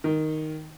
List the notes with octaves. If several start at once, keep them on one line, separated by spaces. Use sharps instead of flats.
D#3